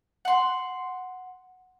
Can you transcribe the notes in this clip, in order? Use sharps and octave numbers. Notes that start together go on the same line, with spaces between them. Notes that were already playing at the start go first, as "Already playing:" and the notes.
F#5 C6